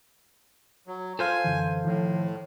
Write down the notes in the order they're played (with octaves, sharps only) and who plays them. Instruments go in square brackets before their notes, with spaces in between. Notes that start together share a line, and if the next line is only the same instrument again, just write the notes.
[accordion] F#3
[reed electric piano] F4 [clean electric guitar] A4 C5 F5 [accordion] G#5
[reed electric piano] F#2 D3 E3
[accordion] A2 [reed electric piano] D#3 F3